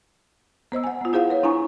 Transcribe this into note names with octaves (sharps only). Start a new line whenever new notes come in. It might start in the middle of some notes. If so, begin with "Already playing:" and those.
B3 C5 D#5 E6
F#5 G#5
B3 F4
E4 G#4 C5 F5 F#5
B4 C#5
D4 E4 G#5 A#5 C#6